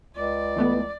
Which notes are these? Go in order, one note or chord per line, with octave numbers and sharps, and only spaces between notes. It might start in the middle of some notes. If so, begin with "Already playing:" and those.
C#2 D5
E3 A3 B3